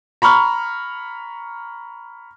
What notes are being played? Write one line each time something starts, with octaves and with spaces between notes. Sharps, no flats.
A#5 B5 C#6 F6